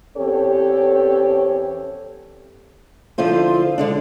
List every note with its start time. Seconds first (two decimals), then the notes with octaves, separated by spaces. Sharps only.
0.17 E2 C4 C#4 G4 A4 C#5
3.18 D3 F3 E4 F4 C5
3.78 D3 G#3 D4